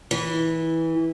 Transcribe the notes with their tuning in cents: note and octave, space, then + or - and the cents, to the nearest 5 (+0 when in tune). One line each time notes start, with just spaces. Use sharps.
E3 -15